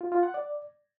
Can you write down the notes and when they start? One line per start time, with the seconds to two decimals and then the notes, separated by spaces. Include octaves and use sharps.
0.01 F4
0.12 F4
0.23 F#5
0.34 D5